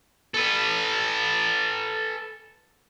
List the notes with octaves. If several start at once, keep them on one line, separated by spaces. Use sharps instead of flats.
A4 B4